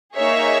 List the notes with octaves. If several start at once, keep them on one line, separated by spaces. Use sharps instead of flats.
A#3 D#4 G#4 C#5 E5